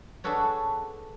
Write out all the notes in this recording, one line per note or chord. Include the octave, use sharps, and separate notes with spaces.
D4 F#4 G#4 A4 B4 C#5